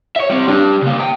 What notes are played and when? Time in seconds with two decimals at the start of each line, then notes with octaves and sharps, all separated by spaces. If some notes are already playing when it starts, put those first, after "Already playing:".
0.16 C#5 E5
0.29 G3 C4
0.48 G3 D4
0.83 C#3 A#3
0.99 E5 G5